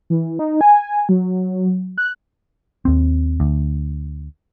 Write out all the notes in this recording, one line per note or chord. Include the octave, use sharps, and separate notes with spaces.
E3
D#4
G#5
F#3
F#6
D#2 C4
D2